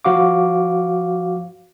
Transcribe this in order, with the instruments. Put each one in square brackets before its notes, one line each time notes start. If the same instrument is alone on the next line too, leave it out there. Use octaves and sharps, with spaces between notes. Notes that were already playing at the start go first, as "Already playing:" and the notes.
[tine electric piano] F3 F#4 F5 D6